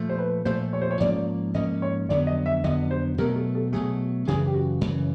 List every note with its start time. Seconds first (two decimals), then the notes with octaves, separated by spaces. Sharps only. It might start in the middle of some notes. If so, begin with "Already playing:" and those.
Already playing: A#2 F3 A3
0.09 C5
0.19 B4
0.45 A#2 F3 A3 C5
0.73 C#5
0.82 C5
0.91 C#5
1.00 G#2 F3 A#3 C#4 D5
1.54 G#2 F3 A#3 C#4 D#5
1.82 C#5
2.09 F2 D3 F#3 B3 D5
2.27 D#5
2.46 E5
2.64 F2 D3 F#3 B3 D#5
2.91 C5
3.18 B2 F#3 A3 A#4
3.36 A4
3.55 A4
3.73 B2 F#3 A3 G#4
4.28 F#2 C#3 E3 G#4
4.46 G4
4.54 F#4
4.81 F#2 C#3 E3